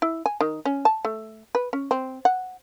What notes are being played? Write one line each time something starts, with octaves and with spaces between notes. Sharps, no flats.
E4
G#5
D#3
C#4
A5
A3
B4
C#4
C4
F#5